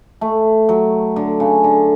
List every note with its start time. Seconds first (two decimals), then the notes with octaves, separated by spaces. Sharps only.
0.21 A3
0.69 F#3
1.16 D3
1.40 C#3
1.64 D3